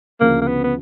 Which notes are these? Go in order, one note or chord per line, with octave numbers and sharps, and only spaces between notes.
D2 C#3 F3 A#3
A#3
B3
B3